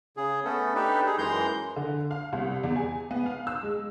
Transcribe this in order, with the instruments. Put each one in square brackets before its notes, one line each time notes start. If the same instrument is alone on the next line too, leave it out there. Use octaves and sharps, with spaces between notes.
[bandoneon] C#3 G#4
A3 B3 C#4 A4
D4 D#4 G4 A4 B4
D#4 G#4
F#2 E3 G#3 A#5 C6 G6
[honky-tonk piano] D3
F5
C2
E2
G#5
B3
F5
E6
G#3